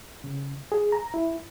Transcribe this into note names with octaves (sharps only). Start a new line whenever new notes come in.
C#3
G#4
A#5
E4